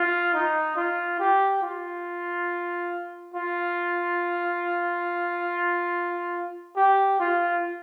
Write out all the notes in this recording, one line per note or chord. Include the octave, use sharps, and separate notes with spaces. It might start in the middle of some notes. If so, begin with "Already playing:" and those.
Already playing: F4
D#4
F4
G4
F4
F4
G4
F4